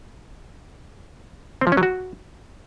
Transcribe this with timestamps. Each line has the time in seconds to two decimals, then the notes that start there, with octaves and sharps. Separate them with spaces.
1.61 C4
1.67 F3
1.72 C#4
1.77 F#3
1.83 F#4